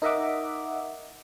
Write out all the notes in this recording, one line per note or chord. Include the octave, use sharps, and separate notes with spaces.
D#4 A#4 D#5 E5 F#5 D6